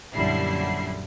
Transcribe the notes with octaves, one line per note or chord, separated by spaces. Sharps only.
A#1 F#2 D3 G3 E4 C7